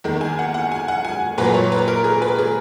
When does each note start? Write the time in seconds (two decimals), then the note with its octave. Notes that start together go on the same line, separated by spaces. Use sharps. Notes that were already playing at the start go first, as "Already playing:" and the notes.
0.04 E2 D#3 A#3
0.21 G#5
0.39 F#5
0.54 F#5
0.72 G#5
0.88 F#5
1.05 G#5
1.38 A#2 F#3 A#3 B4
1.54 C#5
1.72 B4
1.88 A#4
2.04 G#4
2.22 B4
2.38 G#4